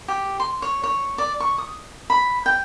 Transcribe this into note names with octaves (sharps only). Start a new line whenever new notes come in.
G4
C6
C#5
C#5
D5
C#6
D#6
B5
G5